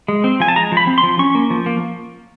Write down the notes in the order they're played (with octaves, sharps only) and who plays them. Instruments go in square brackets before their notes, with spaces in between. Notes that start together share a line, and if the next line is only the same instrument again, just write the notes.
[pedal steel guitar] G#3
C4
F3 G#5
A5
G#3 A#5
F3
B5
C4
C6
F3
C#4 C#6
A#3
F3
A#3